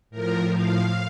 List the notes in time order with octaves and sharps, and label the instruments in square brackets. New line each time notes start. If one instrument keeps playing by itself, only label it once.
[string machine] A2 F3 A#4
F5